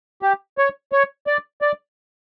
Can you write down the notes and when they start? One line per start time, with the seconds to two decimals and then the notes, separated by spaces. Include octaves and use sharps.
0.22 G4
0.58 C#5
0.92 C#5
1.27 D5
1.62 D5